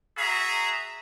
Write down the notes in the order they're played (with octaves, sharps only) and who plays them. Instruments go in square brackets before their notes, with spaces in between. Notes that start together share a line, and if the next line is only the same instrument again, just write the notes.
[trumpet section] F#4 G#4 E5 A#5